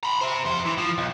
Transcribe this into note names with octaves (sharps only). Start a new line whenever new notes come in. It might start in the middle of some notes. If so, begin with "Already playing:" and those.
A#5 B5
C5 E5
F2 C5
E3
F3
B1